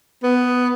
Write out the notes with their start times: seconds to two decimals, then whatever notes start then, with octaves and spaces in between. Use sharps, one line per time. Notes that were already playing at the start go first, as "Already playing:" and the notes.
0.23 B3